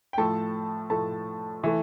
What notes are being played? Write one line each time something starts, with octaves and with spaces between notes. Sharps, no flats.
G5
A2 F3 A3 A4 A5
A2 F3 A3 A4 A5
E3 A3